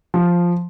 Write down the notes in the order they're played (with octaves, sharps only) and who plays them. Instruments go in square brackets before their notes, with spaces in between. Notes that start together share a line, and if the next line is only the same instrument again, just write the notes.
[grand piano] F3